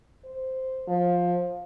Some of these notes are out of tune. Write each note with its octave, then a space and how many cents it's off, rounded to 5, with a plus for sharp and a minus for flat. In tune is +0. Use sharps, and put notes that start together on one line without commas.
C5 -5
F3 +15